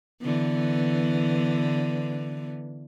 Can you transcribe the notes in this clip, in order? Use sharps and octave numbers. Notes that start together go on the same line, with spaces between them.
D3 E3 B3